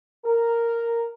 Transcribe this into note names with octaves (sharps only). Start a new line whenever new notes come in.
A#4